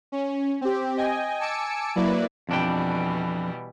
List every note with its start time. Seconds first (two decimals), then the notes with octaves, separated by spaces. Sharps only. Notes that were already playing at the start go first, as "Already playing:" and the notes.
0.12 C#4
0.61 C4 G4
0.97 D#5 G5 G#5
1.40 G#5 A5 D6 E6 C#7 D7
1.96 F#3 A#3 E4 B4 D5
2.49 F2 B2 E3 G3 D4 G5